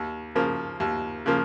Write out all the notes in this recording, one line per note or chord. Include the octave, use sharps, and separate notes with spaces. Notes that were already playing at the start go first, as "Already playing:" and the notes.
Already playing: D#2
C#3 F3 A#3
D#2
C#3 F3 A#3